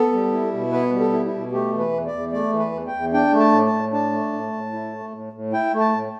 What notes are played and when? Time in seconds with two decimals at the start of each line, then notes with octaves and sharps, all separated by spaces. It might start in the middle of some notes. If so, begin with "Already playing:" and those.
Already playing: B3 A4
0.13 G3
0.32 E4
0.53 B2
0.72 B3 B4
0.92 G3
1.00 A4
1.13 E4
1.26 E4
1.33 B2
1.52 A3 G4
1.73 E3
1.79 B4
1.93 E2
2.06 D5
2.12 E2
2.32 A3 D5
2.53 E3
2.59 B4
2.72 E2
2.87 G5
2.93 E2
3.13 D4 G5
3.32 A3
3.40 A5
3.52 A2
3.66 A5
3.73 A2
3.92 D4 A5
4.12 A3
4.32 A2
4.53 A2
4.73 E4
4.93 A3
5.12 A2
5.33 A2
5.53 E4 G5
5.73 A3
5.80 A5
5.93 A2